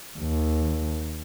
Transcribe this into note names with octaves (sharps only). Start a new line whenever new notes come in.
D#2